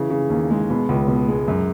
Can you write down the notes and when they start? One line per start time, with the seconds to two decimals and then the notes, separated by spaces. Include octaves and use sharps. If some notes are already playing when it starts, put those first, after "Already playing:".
Already playing: C#3 E3
0.10 C#3
0.30 D#2
0.50 G#3
0.70 B2
0.89 C#2
1.08 B2
1.28 G#3
1.48 F#2